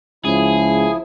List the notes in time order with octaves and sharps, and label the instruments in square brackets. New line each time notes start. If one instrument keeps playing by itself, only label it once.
[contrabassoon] C#2 [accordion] F3 E4 [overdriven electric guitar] G#4